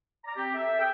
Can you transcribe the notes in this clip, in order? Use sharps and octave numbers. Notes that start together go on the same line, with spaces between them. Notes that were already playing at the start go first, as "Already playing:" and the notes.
D5 A#5
C4 G4
A4 E5
G#4 A4 G5